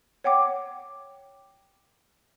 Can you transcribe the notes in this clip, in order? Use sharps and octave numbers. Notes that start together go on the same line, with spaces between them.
C#5 F#5 G5 D6